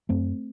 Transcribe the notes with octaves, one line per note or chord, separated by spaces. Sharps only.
F#2 A3 C4